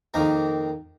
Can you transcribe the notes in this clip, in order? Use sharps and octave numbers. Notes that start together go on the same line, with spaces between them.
F2 D#3 A#3